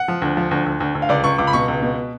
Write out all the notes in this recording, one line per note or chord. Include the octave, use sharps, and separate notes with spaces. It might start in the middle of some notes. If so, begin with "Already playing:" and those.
Already playing: F#5
F3
D2
F3
D2
D2
D2
D2
F5
C#2 D5
C#2 C#6
C#2 D6
B5
B2 C#6
C#2
B2